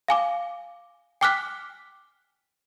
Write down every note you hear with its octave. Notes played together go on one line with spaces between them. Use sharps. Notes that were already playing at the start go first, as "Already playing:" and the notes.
F5 G#5 D6
G5 G#5 D6 F6 F#6 B6